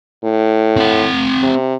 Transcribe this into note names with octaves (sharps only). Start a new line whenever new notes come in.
A2
C4 F#5
C3